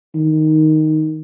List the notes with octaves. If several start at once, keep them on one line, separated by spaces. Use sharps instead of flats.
D#3